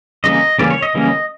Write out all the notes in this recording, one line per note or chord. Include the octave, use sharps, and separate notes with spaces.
C#3 E3 G3 A#3 C#4 D#5
C#3 E3 G3 A#3 C#4 D5
C#5
D#5
C#3 E3 G3 A#3 C#4